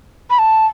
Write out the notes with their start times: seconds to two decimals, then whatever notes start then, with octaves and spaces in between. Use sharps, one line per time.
0.30 B5
0.39 A5